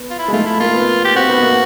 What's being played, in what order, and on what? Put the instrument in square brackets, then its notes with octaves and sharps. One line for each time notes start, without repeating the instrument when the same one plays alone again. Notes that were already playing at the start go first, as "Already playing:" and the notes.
Already playing: [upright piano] B3
[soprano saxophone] F4
E4
[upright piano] G#3
[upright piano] A3 [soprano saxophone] F4
[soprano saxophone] E4
[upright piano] A#3 [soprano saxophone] F4
[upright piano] B3
[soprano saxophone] G4
[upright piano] C4 [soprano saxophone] F#4
[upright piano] B3
A#3